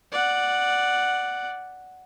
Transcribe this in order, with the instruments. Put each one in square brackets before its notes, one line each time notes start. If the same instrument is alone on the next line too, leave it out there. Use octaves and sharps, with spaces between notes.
[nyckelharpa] D5 F#5